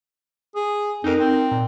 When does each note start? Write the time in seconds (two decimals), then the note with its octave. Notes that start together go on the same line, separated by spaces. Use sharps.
0.55 G#4
1.04 F2 D#4 A#4
1.19 C4
1.51 A#2